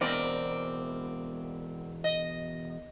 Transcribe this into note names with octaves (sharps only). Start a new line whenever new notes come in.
E2 B2 C4 A#4 D5
D#5